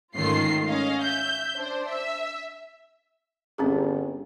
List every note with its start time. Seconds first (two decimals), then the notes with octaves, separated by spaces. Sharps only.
0.16 G#2 D#3 A3 C#4 F4 C7
0.66 C#4 D#5 F5
1.02 E5 G6
1.57 D4 C5
1.88 E5
3.58 G1 C4 C#4 G#4